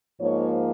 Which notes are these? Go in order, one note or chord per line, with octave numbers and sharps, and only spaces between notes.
G#2 F3 A#3 D#4 C#5